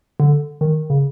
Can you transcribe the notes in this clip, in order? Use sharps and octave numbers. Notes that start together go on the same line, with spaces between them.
D3
D#3
C#3